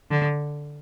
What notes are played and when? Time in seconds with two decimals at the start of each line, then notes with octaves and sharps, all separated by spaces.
0.11 D3